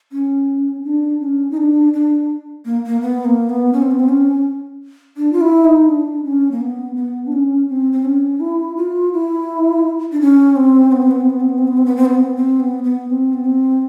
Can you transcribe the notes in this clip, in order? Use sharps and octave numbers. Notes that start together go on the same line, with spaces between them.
C#4
D4
C#4
D#4
D4
D4
A#3
A#3
B3
A#3
B3
C#4
C4
B3
C4
C#4
D4
F4
E4
D#4
D4
C#4
A#3
B3
B3
D4
C#4
C4
C4
C#4
E4
F4
E4
D4
C#4
C4
B3
C4
B3
C4
B3
C4
B3
C4
B3
C4
B3
C4
B3
C4
B3
C4
B3
B3
C4
B3
C4